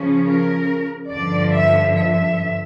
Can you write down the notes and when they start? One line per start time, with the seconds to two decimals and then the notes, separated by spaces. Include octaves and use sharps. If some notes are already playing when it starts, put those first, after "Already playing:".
Already playing: C#3 F3 C#4
0.27 A#4
1.10 G2 D3 F3 D5
1.52 E5
1.93 E5